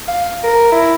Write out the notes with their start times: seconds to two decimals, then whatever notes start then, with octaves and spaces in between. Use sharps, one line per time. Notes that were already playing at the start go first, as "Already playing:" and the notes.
0.08 F5
0.44 A#4
0.72 E4